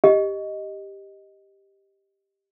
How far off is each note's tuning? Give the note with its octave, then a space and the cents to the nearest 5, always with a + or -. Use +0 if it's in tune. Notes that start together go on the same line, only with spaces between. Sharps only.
G4 +0 D#5 +0